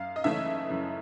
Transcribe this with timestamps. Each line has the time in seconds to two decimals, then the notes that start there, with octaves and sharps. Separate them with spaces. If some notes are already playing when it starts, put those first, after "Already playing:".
Already playing: F#2 F5
0.16 D#5
0.24 C#3 E3 A3 C#4 E5
0.70 F#2